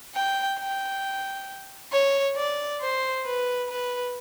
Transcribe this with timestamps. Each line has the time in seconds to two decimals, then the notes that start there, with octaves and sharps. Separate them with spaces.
0.15 G5
0.59 G5
1.92 C#5
2.37 D5
2.81 C5
3.25 B4
3.69 B4